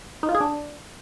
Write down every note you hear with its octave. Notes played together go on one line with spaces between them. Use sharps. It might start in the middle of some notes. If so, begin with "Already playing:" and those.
D#4
F4
G#4
D4